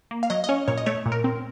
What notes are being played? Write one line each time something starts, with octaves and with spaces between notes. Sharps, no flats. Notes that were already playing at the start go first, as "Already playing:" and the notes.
A#3
F5
F#3 D#5
D#5
C#4 C#5
A#2 C#5
D#5
A3 C#5
A#2
A#4
C4